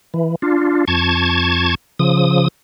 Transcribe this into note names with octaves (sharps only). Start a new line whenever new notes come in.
E3
D4 F4
F2 A5 C#6 G#6
C#3 F3 D#6